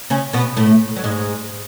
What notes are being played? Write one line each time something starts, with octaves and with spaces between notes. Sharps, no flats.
C#3 C#4
B2 B3
A2 A3
F#3
G#2 G#3